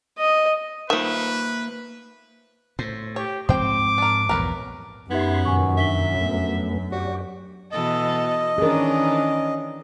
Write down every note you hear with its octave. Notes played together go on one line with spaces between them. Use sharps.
D#5
D#3 F3 A#3 B4 E5
A2 C5
G4 C#5
G#2 F3 C4 C5 G5 D6
D4 A#4
A#1 E2 G2 A#4 B4 C#5
F#2 B3 D#4 G4 E5 B5 C6 G#6
F2 A#2 D#3 F#5 G#5 C#6
D4 E5 B6 G7
F2 A3 B3
F#4 G4 C#5 D5
B2 E3 A4 D#5
D#3 E3 C#4 D4 G#4 A#4